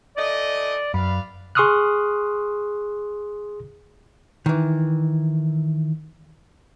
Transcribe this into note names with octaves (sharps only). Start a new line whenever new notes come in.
E3 A3 D5 D#5
F#2 B4 D5 F5 B5
G#4 C6 C#6 D#6 F6 F#6
D#3 E3